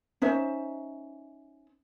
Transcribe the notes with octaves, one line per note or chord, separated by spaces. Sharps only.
C#4 D#4 C5 E5